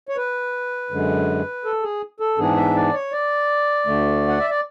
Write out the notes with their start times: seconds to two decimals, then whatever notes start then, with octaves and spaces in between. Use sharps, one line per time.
0.09 C#5
0.17 B4
0.91 F#2 D3 G#3
1.65 A4
1.82 G#4
2.20 A4
2.38 G#2 E3 B3 D4 G#4
2.57 E5
2.75 D5
2.94 C#5
3.12 D5
3.86 D2 D3 A3
4.28 F#5
4.40 E5
4.50 D5